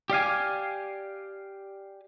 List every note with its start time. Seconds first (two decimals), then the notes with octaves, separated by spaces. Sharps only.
0.10 G4 D5 F5 G#5